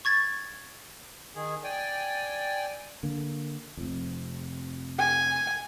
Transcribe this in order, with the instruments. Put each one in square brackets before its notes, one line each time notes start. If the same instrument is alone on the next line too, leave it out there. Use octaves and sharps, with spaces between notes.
[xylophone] C#6 G#6 A6
[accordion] D#3 G#4
D5 G5 G#5
[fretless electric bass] D3 A#3
F1 F2
[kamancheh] G#5